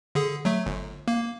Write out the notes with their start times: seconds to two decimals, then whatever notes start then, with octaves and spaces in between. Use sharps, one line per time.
0.15 D3 G#4
0.45 F#3 A3
0.66 G1
1.08 A#3